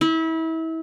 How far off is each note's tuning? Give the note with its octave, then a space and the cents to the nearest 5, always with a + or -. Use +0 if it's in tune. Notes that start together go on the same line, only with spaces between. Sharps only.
E4 -30